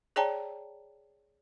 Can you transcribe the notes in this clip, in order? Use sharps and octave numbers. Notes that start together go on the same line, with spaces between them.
G#4 C#5 D5 G5 A5 A#5